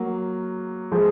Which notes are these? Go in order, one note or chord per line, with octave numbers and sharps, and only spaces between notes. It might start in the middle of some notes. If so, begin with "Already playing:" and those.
Already playing: F#3 A#3
F3 G#3